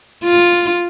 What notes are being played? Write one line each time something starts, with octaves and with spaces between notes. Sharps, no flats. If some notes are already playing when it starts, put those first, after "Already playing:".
F4